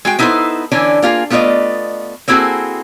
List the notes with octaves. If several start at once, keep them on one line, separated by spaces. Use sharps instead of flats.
G#3 F#4 G5
B3 D#4 E4 A4 B4 C5
D3 E3 C#4 D4
A#3 F4 G4 G#4
A3 B3 F4 C5 D5 D#5
A#3 C4 E4 F#4 G#4 A4